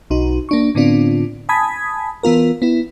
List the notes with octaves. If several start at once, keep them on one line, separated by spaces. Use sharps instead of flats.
B1 D#4 F#4
A#3 D4 C#6
A2 D3 B3 C4 D4 F4
G#5 A5 B5 D#6 G#6 B6
E3 B3 F4 A#4
B3 E4